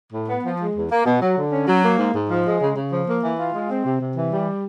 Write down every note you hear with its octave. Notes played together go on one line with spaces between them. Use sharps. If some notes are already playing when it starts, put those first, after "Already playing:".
A2
B3
F3
G#3
E2
A#3
B2
F#3
D3
C#4
F#3
A#3
G#2
G#2
F3
G#3
C#3
C#3
F3
A#3
E3
F4
G#3
C4
C3
C3
E3
G3